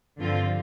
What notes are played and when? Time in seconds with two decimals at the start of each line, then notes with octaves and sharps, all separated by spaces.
0.19 G2 D3 F3 C4 F4